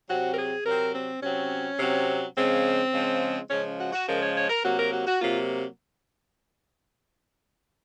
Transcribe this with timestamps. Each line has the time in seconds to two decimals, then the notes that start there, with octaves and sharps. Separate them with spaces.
0.08 C3 F#3 C4 F#4
0.32 A#4
0.37 G#4
0.65 C3 F#3 C4 A#4
0.93 C4
1.22 C3 F#3 C4 C#4
1.78 C3 F#3 C4
2.36 C#3 F3 G#3 C4
2.93 C#3 F3 G#3
3.49 C#3 F3 G#3 C#4
3.78 F#4
3.92 F#4
4.06 C#3 F3 G#3 A#4
4.21 C#5
4.35 C#5
4.49 A#4
4.63 C3 F#3 A#3 F#4
4.77 A#4
4.92 F#4
5.06 F#4
5.20 C3 F#3 A#3 F4